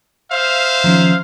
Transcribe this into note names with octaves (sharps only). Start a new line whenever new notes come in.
C5 E5 F5
D#3 F3 C#4